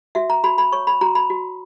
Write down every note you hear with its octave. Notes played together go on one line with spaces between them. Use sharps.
F#4 E5
A#5
F#4 B5
B5
C#5 C#6
B5
F#4 A#5
B5
F#4